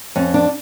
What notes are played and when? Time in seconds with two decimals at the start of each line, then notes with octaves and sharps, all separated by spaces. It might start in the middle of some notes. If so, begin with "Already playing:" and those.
0.16 F2 C#4
0.34 D4